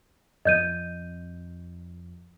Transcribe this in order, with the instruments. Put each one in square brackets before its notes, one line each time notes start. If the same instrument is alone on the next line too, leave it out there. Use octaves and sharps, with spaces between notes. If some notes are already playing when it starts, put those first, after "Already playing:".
[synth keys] F2 [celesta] D#5 G6 D#7